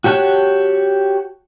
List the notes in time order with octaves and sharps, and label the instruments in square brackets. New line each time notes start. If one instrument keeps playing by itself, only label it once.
[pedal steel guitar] F#4 G4 C#5 A5 F#6